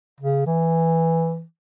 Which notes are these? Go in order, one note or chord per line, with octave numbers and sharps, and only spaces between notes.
C#3
E3